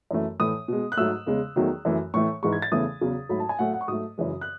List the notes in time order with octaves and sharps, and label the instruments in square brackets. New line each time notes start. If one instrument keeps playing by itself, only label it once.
[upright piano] F#2 E3 A3
A2 E3 A3 D#6
B2 G#3
F#6
G#2 F#3 A3 E6
E2 C#3 G#3
E2 D#3 F#3 A3
F#2 E3 A3
A2 E3 A3 C#6
G#2 E3 G#3 C#6
G#6
A6
E2 C#3 E3 A3 D#6
E2 C#3 F#3
G#2 F#3 A3 B5
A5
G#5
A2 F#3 A3 F#5
F#5
C#6
G#2 F#3 A3 D#6
F#2 C#3 E3 G#3
F#6